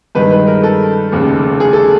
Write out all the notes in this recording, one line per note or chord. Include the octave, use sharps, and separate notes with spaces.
G2 D#3 G#3 B4
B4
A#4
A4
F1 D#2 C#3
G#4
A4